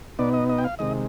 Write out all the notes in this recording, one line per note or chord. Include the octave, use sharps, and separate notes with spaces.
B2 B3 D#4 D5
D#5
D#5
G5
F5
C3 D#3 G#3 D#5